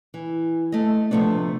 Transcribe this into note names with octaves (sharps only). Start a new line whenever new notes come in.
E3
A3 D#5
C3 F3 A3 B3 D4